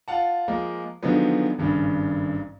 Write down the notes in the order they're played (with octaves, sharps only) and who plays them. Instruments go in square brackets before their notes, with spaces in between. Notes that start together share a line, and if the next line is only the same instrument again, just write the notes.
[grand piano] F4 F5 F#5 A5
F3 G#3 A#3
D3 D#3 F3 F#3 G#3 B3
G#1 G2 C#3